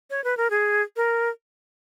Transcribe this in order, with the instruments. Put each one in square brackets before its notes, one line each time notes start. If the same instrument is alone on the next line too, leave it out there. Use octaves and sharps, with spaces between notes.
[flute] C#5
B4
A#4
G#4
A#4